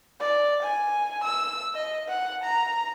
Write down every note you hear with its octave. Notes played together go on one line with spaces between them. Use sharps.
D5
G#5
E6
D#5
F#5
A#5